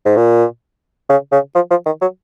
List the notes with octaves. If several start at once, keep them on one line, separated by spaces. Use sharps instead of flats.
G#2
A#2
C#3
C#3
F3
F3
D#3
F#3